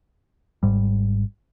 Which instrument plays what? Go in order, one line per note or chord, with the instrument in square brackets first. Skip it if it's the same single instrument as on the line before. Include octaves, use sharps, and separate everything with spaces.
[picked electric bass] G#1 G#2 G3